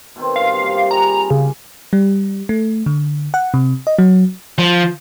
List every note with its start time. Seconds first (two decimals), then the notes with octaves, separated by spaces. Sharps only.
0.16 B2 D#3 C4
0.36 G2 F4 F5
0.62 C3 A#3
0.91 G3 G#4 A#5
1.30 C#3
1.93 G3
2.49 A3
2.86 D3
3.34 F#5
3.54 C3
3.87 D#5
3.99 F#3
4.59 F3